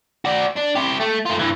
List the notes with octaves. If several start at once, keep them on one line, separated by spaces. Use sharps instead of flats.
F#4 D5
D4
E4 G4
A3
A3 F4
G2 E3